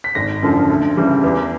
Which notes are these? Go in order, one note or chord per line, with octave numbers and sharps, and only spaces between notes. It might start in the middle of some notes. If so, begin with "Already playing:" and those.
B6
G#1 A#6
F#2 D3 F3
D2
C#3 E3 G3
E2